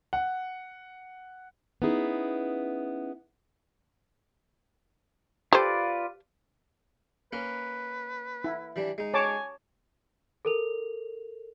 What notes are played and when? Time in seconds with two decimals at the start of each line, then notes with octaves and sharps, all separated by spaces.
0.13 F#5
1.82 B3 C#4 D#4 E4 G#4
5.53 F4 G4 A4 B4 C5 D5
7.33 A#3 C#4 A#4 B4
8.44 E4
8.76 E3 G3 D4
8.98 G#3 D#4
9.14 C#5 G#5 A5 D6
10.45 A4 A#4 F7